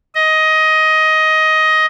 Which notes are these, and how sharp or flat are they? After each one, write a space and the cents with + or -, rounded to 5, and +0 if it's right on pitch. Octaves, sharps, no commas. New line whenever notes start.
D#5 +15